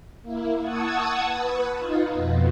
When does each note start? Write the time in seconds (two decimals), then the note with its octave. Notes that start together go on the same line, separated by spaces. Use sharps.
0.22 A#3 E4
0.60 F#5 A5 C#6 D#6 E6 G#6
1.22 B4
1.76 D#4 F4
2.10 F2 B2